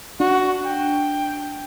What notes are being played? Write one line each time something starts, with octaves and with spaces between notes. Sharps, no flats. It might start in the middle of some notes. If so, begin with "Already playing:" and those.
D4 F#4
G5